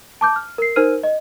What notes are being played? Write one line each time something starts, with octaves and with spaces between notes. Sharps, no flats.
A5 D6 G6
F6
A#4 C7
D#4 A#4 C5 F6 D#7
D#5